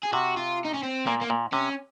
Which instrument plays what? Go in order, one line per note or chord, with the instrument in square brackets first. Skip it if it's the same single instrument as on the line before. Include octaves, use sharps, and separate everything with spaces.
[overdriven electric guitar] G#4
[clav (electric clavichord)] C3 [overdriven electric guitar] F#4
[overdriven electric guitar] F4
D#4
C#4
C4
[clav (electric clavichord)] A#2 [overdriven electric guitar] A#3
[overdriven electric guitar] A#3
[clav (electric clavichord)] A#2
[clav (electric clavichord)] C3 [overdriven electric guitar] C#4